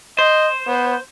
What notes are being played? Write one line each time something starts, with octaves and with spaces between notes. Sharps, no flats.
C5 D#5
B3